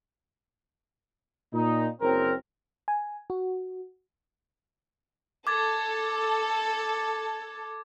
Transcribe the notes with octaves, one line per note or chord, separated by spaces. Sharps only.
A#2 D#4
F#1 C4 A#4
G#5
F#4
A4 D6 G#6 A6